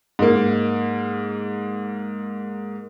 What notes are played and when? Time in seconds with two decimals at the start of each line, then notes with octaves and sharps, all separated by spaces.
0.19 G#2 A#3